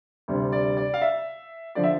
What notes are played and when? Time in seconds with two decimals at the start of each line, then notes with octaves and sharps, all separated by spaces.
0.28 D2 C3 G3
0.52 D5
0.77 D5
0.94 F5
1.02 E5
1.75 D3 F3 D5
1.84 E5